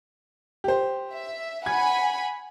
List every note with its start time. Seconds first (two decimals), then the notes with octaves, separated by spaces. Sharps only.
0.64 G4 C5
1.13 E5
1.66 F#5 G#5 B5 G#6